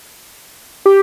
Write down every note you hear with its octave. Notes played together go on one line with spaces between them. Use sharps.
G4